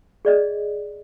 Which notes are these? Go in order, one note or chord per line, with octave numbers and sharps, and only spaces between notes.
G#4 D5 D#5